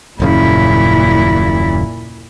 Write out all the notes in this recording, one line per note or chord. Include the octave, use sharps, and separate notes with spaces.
D#1 F#2 A#2 C#3 E4